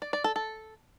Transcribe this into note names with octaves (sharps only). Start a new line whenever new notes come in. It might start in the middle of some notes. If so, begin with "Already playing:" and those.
D5
D5
A4
A4